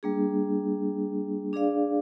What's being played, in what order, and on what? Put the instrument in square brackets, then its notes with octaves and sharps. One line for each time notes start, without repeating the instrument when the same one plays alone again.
[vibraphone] G3 A#3 D4 G#4
D4 G#4 D5 F5